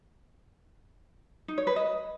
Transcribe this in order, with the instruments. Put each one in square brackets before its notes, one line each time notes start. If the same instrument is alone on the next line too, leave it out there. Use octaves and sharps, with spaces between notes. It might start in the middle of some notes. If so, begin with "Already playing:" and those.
[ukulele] D#4
C#5
B4
D#5